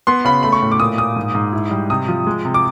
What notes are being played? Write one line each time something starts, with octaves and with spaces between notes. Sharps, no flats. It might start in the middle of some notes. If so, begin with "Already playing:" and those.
B3 C6
C#3 B5
A3 B5
C#6
A2
D6
A#2 D#6
A#2 D#6
G#2
G#2
E4
G3
C3 D#6
F3
G#3
C3
D6